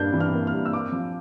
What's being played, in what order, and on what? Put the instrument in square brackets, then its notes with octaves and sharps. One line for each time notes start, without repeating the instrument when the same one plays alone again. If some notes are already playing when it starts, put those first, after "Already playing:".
Already playing: [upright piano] G2 A#3 D4 G6
E3
F6
A#3
F6
G2
E6
C4 D6
F3